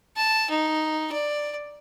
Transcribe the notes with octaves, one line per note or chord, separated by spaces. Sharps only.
A5
D#4
D5